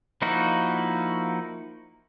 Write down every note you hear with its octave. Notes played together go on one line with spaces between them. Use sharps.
F3 A#3 D#4 E4 F#4